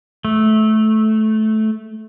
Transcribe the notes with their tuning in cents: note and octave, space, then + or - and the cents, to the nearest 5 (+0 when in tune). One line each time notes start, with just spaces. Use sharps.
A3 -15